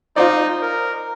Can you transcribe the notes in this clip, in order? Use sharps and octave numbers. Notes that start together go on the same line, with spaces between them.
D#4 F4 C5 D5
A#4